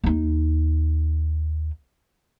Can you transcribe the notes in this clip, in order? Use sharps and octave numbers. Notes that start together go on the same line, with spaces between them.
D#2 D#4